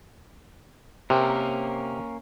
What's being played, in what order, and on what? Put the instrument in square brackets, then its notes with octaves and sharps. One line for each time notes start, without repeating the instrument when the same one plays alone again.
[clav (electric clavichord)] C3 [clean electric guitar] A#3 C#4 A#4